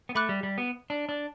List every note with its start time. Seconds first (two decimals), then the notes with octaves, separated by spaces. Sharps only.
0.09 B3
0.15 A3 E5 B5 D6 F#6
0.29 G3
0.43 G3
0.58 B3
0.90 D4
1.09 D4